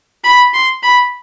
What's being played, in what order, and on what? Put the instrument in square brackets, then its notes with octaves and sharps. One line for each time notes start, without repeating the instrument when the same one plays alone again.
[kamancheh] B5
C6
B5